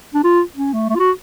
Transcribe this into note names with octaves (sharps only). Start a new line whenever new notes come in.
D4
F4
C#4
A3
A3
F4
F#4